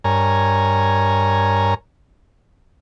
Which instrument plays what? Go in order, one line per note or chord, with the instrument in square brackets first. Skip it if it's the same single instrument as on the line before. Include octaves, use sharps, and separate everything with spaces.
[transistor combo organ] G2 A#4 C#5 G#5 A#5